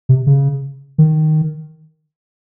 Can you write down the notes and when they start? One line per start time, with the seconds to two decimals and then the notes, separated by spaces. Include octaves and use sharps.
0.09 C3
0.27 C#3
0.98 D#3